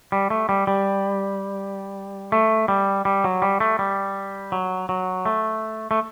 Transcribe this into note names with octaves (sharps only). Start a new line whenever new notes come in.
G3
A3
G3
G3
A3
G3
G3
F#3
G3
A3
G3
F#3
F#3
A3
A3